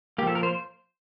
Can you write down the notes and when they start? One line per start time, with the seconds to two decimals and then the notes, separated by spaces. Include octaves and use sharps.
0.18 A#3 G4
0.23 F3 A4
0.35 A#4
0.43 C5